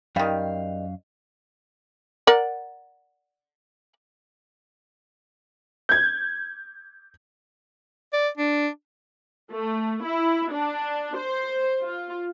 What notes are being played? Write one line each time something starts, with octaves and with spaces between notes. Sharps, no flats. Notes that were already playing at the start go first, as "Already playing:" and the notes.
F#2 D#3 G3 F5
A#4 D5 F#5
G6 G#6
D5
D4
A3
E4
D4
C5
F4